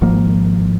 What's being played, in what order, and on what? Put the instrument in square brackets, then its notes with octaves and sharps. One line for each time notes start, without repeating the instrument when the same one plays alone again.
[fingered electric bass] G#1 G#2 F3 A#3